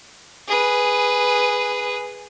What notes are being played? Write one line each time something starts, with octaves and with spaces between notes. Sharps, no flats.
G#4 B4